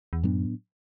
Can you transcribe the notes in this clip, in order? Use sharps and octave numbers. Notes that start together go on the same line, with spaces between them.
E2
F#2 A2 F#3 B3 D4